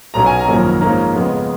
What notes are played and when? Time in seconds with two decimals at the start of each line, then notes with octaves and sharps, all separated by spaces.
0.14 B1 B2 F#3 C#4 A#5
0.26 G#5
0.39 A#5
0.48 G#1 F#2 F3 A#3 C#4
0.81 G#2 F3 A#3 C#4
1.14 F2 C#3 G#3 B3